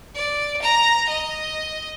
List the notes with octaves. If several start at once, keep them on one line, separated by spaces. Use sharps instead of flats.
D5
A#5
D#5